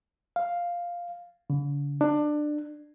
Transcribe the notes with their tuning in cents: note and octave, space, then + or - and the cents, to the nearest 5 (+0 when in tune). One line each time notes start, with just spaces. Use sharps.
F5 +0
D3 -45
D4 +20